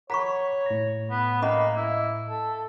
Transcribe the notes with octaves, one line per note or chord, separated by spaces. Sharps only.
C#5 F#5 A#5 B5 C#6 B6
A2 A#6
B3
A#3 C#4 D#5 B5
E4
A4